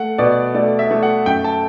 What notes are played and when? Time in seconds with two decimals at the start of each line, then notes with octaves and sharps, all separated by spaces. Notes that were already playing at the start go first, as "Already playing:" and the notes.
Already playing: A3 F#5
0.18 B2 D5
0.55 A3 D5
0.79 E5
0.91 A3
1.03 F#5
1.26 F#2 G5
1.44 A5